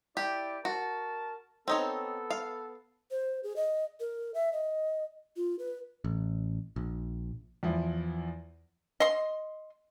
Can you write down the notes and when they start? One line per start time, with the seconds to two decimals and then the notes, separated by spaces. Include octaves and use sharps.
0.17 E4 G4 D5
0.65 F#4 A#4 A5
1.68 B3 C4 D#4 A4 C#5
2.30 F5
3.11 C5
3.43 G#4
3.56 D#5
4.00 A#4
4.34 E5
4.53 D#5
5.37 F4
5.59 B4
6.04 A1
6.76 A#1
7.63 E2 F3 E4
9.00 D#5 C6